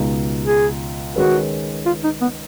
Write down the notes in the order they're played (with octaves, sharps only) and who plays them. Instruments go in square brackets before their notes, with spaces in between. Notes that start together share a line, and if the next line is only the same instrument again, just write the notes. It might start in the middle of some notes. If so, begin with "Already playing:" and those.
Already playing: [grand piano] C#2 B2 G#3 D#4
[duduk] G#4
[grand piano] D#3 G#3 C#4 G#4 B4 [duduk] F#4
[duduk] F4
D#4
B3